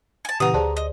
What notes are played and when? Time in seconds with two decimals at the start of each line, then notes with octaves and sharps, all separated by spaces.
0.25 G#5 A5
0.40 A#2 C#3 E3 G4 B4 F#5 A#5 D#6
0.54 D2 G#4 C5 D5 A5
0.77 D#5